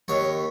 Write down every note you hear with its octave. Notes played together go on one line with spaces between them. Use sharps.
D#2 C#5